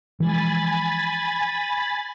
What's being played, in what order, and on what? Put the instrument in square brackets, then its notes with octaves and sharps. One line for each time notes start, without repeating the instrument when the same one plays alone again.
[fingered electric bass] E3 F3 G#3 [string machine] G#5 B5 A6